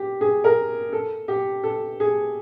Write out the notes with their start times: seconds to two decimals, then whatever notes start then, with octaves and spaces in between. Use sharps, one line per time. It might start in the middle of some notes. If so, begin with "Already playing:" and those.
Already playing: G4
0.21 G#4
0.44 A#4
0.93 A4
1.28 G4
1.64 A4
2.00 G#4